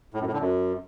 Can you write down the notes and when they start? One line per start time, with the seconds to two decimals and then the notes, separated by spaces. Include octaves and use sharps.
0.14 A2
0.20 F#2
0.27 A2
0.33 D3
0.39 F#2